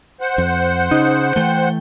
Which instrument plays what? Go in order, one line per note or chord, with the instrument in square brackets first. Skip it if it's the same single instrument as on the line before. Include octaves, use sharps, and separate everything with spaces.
[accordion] C5 F#5
[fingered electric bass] F2
[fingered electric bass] C#3 [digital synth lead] D#4
[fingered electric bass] E3 A3 [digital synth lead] G5